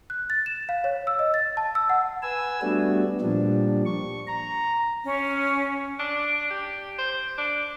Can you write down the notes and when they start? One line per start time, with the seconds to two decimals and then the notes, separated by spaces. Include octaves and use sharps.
0.10 F#6
0.30 A6
0.46 E7
0.69 F5
0.84 C#5
1.07 E6
1.19 D#5
1.34 A6
1.57 A5
1.75 E6
1.90 F#5
2.22 B4 G#5 E6
2.62 G3 A3 B3 D4 F#4
3.21 A#2 F3 G3 D4
3.85 C#6
4.27 A#5
5.04 C#4
5.99 D4
6.50 G4
6.98 C5
7.37 D4